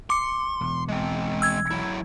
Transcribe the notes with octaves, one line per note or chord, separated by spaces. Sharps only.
C6 D6 C#7
E1
G#3 C4
E6 G#6
F#3 E4